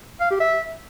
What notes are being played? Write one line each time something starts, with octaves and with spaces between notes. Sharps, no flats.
F5
G4
E5